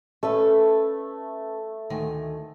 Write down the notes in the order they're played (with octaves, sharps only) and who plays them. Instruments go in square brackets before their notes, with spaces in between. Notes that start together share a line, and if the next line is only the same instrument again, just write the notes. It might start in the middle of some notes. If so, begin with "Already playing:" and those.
[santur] A3 [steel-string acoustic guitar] C#4 A4 B4
[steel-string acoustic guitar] D2 D#3 G#5